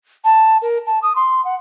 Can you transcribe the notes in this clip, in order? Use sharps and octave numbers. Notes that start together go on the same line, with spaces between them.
A5
A#4
A5
D#6
C6
F#5